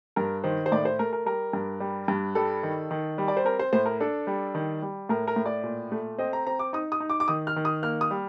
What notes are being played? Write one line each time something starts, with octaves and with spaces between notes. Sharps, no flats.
G2 A#4
D#3 C5
C5
A2 D5
C5
A3 A#4
A#4
G3 A#4
G2
G3
G2
G3 A4
D#3
D#3
G3
D5
C5
C4 A#4
C5
A2 C5
A#4
D4 A4
G3
D#3
G3
A2 A#4
A#4
A2
D5
A#2
A3
C4 D#5
A#5
C4 A#5
D6
D#4 D#6
D#6
D#4
D6
D6
D#3 D#6
F6
D#3
D#6
A#3 F6
D#6
G3